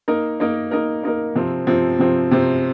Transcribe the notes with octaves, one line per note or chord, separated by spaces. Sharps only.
A#3 D#4 A#4
A#3 D#4 A#4
A#3 D#4 A#4
A#3 D#4 A#4
C3 F3 C4
C3 F3 C4
C3 F3 C4
C3 F3 C4